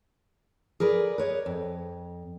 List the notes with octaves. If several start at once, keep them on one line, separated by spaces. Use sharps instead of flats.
G#4 A#4 B4 D5
B4 C#5 D#5
F2